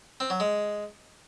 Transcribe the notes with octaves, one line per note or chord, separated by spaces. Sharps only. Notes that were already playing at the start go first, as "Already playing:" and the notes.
C4
F#3
G#3